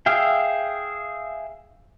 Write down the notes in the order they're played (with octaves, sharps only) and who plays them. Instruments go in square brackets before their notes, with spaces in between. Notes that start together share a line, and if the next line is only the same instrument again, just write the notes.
[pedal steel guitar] G#4 E5 F5 G5